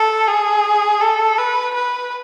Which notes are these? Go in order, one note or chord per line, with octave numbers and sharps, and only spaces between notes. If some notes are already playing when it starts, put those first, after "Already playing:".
Already playing: A4
G#4
A4
B4
B4